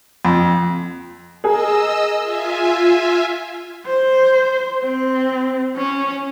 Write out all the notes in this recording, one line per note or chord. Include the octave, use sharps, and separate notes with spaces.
F2
G#4 A#4 D#5 E6
F4 E5 G#5
C5
C4
C#4